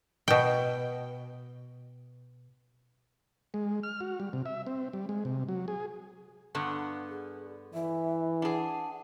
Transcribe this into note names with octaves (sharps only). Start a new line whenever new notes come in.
B2 G5
G#3
F6
F#4
G3
C3
E5
C4
G3
G#3
C3
F#3
G#4
G2 D3 B3
G#4
E3 E5
D4 G#4 F#5